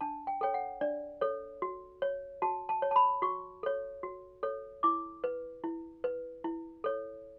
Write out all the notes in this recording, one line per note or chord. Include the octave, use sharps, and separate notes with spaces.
D4 A5
G5
A4 C#5 G5
F#5
D4 D5
A4 C#5
F#4
C#5
F#4 A5
A5
C#5
A5
B5
F#4 C#6
A4 C#5
F#4
A4 C#5
E4 D6
B4
E4
B4
E4
A4 C#5